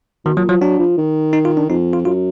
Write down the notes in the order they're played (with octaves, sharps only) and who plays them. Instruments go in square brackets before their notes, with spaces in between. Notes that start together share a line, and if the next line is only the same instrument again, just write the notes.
[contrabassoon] B2 [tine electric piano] D#3
[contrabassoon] A#2 [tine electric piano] F#3
[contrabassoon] F3 [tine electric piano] F#3
[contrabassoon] F#3 [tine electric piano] D4
[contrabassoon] F3
D#3
[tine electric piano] D#4
F4
D4
[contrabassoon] F2 [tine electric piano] D#4
[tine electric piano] F4
[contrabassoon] F#2 [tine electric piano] F4